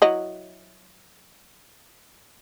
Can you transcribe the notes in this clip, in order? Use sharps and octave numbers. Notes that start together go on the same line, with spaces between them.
F#3 E4 D#5